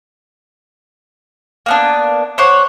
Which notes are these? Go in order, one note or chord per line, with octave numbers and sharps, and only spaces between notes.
A#3 B3 D4
C5 C#5 F#5 D6